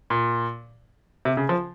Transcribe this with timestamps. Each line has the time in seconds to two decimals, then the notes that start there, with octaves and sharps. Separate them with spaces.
0.10 A#2
1.25 C3
1.37 C#3
1.49 F3